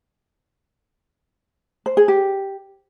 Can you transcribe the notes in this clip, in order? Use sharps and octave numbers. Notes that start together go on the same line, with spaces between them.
C5
G#4
G4